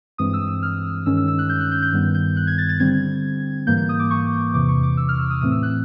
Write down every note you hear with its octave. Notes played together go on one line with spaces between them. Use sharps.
G2 E3 G#3 C4 D#6
E6
E6
F6
G2 D#3 G#3 C#4 E6
E6
E6
F#6
G6
F#6
G6
G6
G2 D#3 G3 B3
G6
F#6
G#6
A6
A6
D3 G3 C4 G#6
G#2 E3 G3 A#3 G6
G6
D#6
D6
C#6
E2 C3 E3 D6
C#6
D6
E6
F6
E6
D#6
A2 E3 A3 C4 D#6
E6
F#6